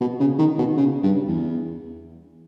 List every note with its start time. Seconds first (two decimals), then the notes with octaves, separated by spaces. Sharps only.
0.01 B2
0.20 C#3
0.39 D#3
0.58 B2
0.77 C#3
1.03 G2
1.28 E2